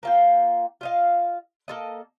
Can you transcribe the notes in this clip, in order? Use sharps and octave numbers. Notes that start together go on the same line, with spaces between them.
A#3 F4 G5
F4 D#5 F5
A#3 A4 D#5